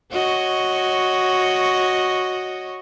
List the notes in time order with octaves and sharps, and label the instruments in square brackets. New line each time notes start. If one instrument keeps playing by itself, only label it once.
[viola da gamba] F#4 C#5 D#5